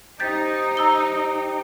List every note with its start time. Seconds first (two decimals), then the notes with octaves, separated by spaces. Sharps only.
0.20 D#4 G4 C5 G5 G6 A6 B6
0.77 A#5 E6 G7